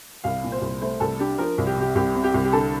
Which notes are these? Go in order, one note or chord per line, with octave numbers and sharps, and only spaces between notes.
C2 F5
A#2
C5
C2
A3 C5
C2 A4
D4 G4
F3 A#4
C2
G4
C3 G4
C2 G4
C3
G4
C2
G4
D3 A4